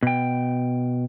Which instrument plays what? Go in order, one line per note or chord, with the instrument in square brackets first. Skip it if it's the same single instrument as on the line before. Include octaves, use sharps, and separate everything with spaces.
[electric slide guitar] B2 G5